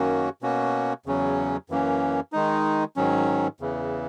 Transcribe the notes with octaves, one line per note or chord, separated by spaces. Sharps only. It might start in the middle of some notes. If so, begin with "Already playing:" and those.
Already playing: F#2 D#3 A#3 C#4 F#4
B2 A#3 C#4 F#4
E2 C#3 F#3 C#4
F#2 E3 A#3 C#4
D#3 G#3 D#4
G#2 D#3 F#3 C#4
E2 C#3 E3